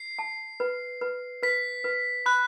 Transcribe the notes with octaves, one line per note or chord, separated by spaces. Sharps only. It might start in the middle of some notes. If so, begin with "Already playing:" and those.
Already playing: C7
A5
B4
B4
B4 B6
B4
B5 F#6